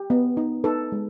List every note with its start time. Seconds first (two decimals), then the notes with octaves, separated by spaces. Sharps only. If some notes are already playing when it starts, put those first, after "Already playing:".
Already playing: G4
0.10 B3
0.37 D#4
0.64 D#4 A4 B4
0.92 G#3